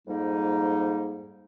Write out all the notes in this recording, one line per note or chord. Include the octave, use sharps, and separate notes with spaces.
F2 G#2 G3 A#3 D#4